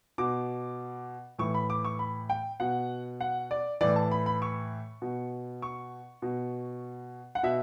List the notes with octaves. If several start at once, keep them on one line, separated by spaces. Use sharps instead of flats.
B2 D6
A2 E3 C#6
B5
D6
C#6
B5
G5
B2 F#5
F#5
D5
A2 E3 D5
A5
B5
B5
C#6
B2
C#6
B2
F#5
B2 E5